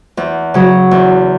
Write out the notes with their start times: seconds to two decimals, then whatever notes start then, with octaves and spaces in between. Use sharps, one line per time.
0.17 E2
0.54 C#3 F#3
0.91 E2